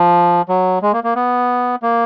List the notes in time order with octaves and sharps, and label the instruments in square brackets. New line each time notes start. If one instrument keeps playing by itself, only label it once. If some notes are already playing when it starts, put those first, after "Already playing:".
Already playing: [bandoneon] F3
F#3
G#3
A#3
A#3
B3
A#3